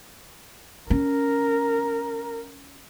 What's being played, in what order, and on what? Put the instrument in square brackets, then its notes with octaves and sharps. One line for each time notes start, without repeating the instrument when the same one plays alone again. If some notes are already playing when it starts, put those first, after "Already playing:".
[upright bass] C#4 [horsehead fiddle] A#4